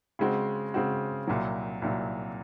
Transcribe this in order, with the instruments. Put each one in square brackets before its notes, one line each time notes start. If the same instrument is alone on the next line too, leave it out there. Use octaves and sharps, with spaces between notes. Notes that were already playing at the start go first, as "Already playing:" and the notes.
[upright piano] C#3 G#3 C4 F#4
C#3 G#3 C4 F#4
C2 A#2 F#3
C2 A#2 F#3